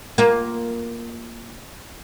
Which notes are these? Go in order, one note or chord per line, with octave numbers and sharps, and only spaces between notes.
A#3 F4